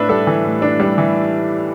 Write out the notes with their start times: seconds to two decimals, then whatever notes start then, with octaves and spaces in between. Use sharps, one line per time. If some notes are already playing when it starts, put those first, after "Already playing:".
Already playing: A2 D4 B4 E5
0.09 G3 A4
0.27 E3
0.44 A2
0.62 D4
0.80 G3
0.98 E3